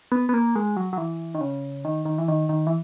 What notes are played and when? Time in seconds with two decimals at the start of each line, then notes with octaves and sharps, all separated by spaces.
0.12 B3
0.29 B3
0.34 A#3
0.56 G#3
0.77 F#3
0.93 F#3
0.98 E3
1.35 D#3
1.41 C#3
1.85 D#3
2.05 D#3
2.18 E3
2.28 D#3
2.49 D#3
2.67 E3